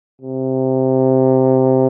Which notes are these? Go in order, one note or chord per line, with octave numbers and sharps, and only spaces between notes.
C3